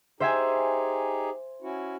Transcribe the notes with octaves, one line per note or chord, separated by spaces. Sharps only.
D#4 G4 G#4 C5 E5 G#5
C#4 E4 F#4